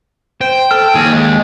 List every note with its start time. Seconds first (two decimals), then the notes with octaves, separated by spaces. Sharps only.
0.41 C5 G5
0.71 A4 F6
0.95 D#2 G#4
1.13 G#3